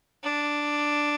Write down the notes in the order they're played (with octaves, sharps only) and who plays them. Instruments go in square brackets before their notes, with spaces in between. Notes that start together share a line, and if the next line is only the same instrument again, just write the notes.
[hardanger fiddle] D4